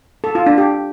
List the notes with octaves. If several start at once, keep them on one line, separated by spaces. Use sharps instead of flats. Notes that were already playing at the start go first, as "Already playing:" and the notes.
A4
F4
D4
G4